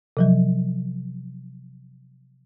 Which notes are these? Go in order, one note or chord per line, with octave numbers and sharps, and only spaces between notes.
C3 F3 F#3